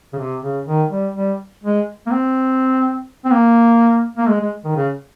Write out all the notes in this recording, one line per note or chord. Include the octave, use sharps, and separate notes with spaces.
C#3
C3
C#3
D#3
G3
G3
G#3
A#3
C4
C4
A#3
A#3
G#3
G#3
D#3
C#3